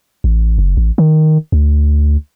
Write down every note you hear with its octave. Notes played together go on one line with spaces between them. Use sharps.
A1
F#1
A1
D#3
D2